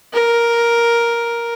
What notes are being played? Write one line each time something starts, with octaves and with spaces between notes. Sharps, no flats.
A#4